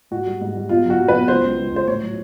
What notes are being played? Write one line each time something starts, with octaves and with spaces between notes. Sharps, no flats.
G#2 F#4
G3
G#2
G3
B2 F4
F#3 F#4
F#3
B4
B2
C#2 C5
C#2
C#2
C#2 C5
A2 C#5
F#3